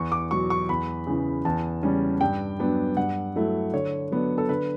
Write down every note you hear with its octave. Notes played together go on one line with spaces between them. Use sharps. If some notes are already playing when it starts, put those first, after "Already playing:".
Already playing: E2 C#6
D6
B2 F#3 C#6
C#6
E2 B5
C#3 E3
E2 A5
C#3 G3 C#4
G2 G5
F#3 B3 D4
G2 F#5
F#3 A3 E4
D3 C#5
F#3 B3 D4
A4
D3 B4